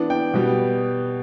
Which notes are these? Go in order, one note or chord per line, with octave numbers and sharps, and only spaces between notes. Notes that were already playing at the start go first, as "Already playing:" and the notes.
Already playing: E3 B3 D4
G5
B2 G3 B3